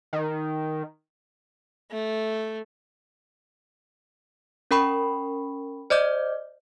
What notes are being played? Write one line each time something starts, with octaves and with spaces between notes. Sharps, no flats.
D#3
A3
C#4 A#4 G5 B5 C#6
C5 D5 D#5 D6 G6